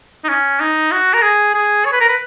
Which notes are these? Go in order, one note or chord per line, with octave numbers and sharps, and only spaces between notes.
D#4
C#4
D#4
F#4
A#4
G#4
G#4
C#5
B4
A#4
B4